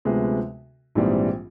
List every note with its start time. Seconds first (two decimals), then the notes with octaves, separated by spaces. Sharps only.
0.05 D2 C3 F3 G#3 B3
0.95 A#1 G#2 E3 G3 C4